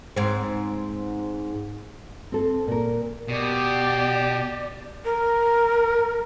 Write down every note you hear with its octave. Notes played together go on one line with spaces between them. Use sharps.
G#2 C4
C4 A4
A#2 A#4
B2 G4 D5
A#4